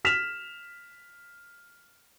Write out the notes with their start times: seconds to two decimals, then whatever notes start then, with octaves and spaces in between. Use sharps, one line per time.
0.05 F6 B6 E7 F7